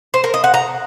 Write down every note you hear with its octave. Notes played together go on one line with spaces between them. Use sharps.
C5
A#4
D#5
F#5
A#5